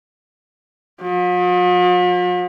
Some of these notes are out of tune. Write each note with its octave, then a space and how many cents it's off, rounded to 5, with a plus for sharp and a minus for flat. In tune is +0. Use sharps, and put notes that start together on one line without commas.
F3 +45